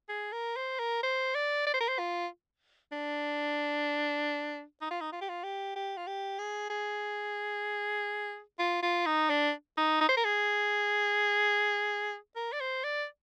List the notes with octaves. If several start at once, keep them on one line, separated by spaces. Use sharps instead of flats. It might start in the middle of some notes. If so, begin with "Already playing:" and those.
G#4
A#4
C5
A#4
C5
D5
D5
C5
A#4
C5
F4
D4
D#4
F4
D#4
F4
G4
F4
G4
G4
F4
G4
G#4
G#4
F4
F4
D#4
D4
D#4
D#4
C5
A#4
G#4
A#4
D5
C5
D5